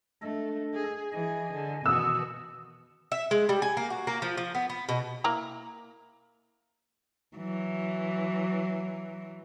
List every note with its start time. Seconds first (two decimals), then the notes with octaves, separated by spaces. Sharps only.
0.22 A3 D4 A4 D#5
0.74 G#4
1.13 E3 G#4 D#5 G#5
1.53 D3
1.86 B2 D#3 E3 F#4 D#6 E6
3.12 E5
3.31 G#3
3.49 G3
3.62 G#5
3.77 A#3
3.90 F#4
4.07 A#3
4.22 F3
4.37 F3
4.55 B3
4.70 B3
4.89 B2
5.24 A#3 E4 A#5
7.37 E3 F#3